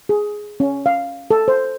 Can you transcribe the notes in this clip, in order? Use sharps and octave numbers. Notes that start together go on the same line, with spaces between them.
G#4
C#4
F5
A4
C5